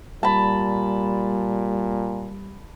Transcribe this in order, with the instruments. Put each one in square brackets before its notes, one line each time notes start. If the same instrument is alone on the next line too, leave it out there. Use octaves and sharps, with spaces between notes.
[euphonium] A#2 [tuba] G3 [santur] A5 B5